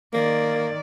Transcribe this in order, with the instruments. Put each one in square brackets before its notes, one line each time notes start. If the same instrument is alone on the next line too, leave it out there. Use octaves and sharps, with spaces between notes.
[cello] D#3 D5 [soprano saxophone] A#3